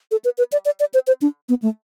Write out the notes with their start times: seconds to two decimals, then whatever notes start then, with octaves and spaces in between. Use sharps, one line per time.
0.11 A4
0.24 B4
0.38 B4
0.52 D5
0.65 D5
0.80 D5
0.94 C5
1.07 C5
1.22 D4
1.49 B3
1.62 A3